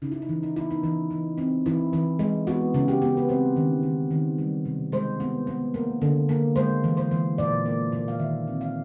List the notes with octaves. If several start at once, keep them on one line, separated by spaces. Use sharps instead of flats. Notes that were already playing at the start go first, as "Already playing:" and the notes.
C#3 D#4
E4
D#4
E3
D#4
B3 E4
D#4
E3
E3
C4
E3 E4
E3
G#3
B3 F#4
C#3
G4
B3
B4
C4 C5
D#3
D#3
D#3
G3
C3
G#3 C5
B3
B3
A#3
D3
A#3
G#3 C5
E3
C5
E3
A#2 D5
A#3
A#2
F5
D#3 E5
C4
F5